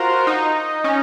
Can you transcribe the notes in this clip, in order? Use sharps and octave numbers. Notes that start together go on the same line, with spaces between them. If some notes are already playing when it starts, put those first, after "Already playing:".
Already playing: F4 F#4 A#4 C5
D#4
C#4